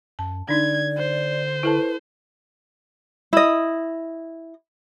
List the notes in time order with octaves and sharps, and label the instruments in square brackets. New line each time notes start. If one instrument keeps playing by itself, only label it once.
[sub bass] F#2 [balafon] A5
[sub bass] D3 [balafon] D4 D#4 [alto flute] D5 [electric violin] G#6
[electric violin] C5
[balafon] E4 A4 A5 [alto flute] B4
[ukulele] E4 D#5